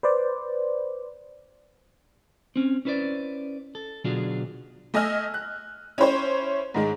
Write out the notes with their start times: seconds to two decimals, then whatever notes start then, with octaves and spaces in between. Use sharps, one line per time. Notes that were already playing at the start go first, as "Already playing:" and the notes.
0.03 B4 C5 D5
2.56 C4 C#4
2.85 C#4 E4 B4 C5 D5
3.75 A4
4.04 B2 D3 F#3 D4 F4 G#4
4.94 A3 D#5 G#5 E6 F6
5.34 F#6
5.98 C#4 E4 C5 C#5
6.74 G#2 D#3 G#3